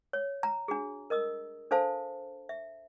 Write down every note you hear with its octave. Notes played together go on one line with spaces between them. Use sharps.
C#5
A#5
D4 F#4 G#4
A#4 D#5 D#6 E6
D4 A4 C5 F5 A5
E5